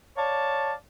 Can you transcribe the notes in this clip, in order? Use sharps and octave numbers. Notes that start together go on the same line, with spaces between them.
C#5 D5 F5 A5